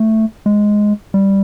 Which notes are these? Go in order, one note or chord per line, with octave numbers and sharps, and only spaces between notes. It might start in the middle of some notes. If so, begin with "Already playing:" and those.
Already playing: A3
G#3
G3